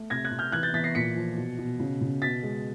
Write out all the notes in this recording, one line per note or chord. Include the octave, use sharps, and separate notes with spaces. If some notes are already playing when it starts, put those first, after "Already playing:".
Already playing: A3
C3 G#6 A#6
F#6 G#6
C3
F6 G6
E3 F#6 G#6
G6 A6
E3 A6 B6
A#6 C7
A#2 B6 C#7
F3
B2
B2
C#3
C#3
B2 A6 B6
G#3